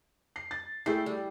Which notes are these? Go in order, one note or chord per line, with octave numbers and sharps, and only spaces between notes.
C7
A6
A3 E4 G#4 G5 C7
G3